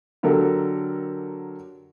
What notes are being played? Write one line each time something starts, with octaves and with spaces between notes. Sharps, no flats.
D3 F#3 G4 A4 A#4